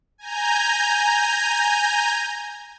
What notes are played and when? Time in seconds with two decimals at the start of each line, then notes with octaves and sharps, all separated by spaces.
0.18 G#5 A#5 G6